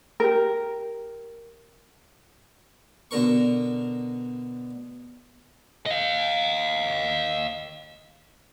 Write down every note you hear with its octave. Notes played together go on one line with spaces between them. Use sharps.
G4 A#4
B2 D3 A#4 C#6
D#5 F5